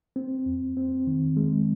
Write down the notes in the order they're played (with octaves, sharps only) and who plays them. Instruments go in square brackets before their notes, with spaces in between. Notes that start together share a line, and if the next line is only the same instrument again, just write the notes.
[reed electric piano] C4
F2
C4
D#3
G#3